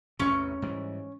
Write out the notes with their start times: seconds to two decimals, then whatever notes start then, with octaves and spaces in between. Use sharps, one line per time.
0.19 A1 E2 C3 C#4 C#6
0.62 G#2 E3 G3